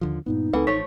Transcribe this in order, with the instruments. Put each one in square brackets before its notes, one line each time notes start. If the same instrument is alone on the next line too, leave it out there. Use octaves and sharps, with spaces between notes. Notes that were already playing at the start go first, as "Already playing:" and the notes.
[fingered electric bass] D#2 D3 F3
[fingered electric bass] G2 A#2 B3 [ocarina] D#4
[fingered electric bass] C#2 A3 C4 [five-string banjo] E3 F#5 [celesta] A4 B4
[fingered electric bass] A1 [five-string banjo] F3 A3 C#5 [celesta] B6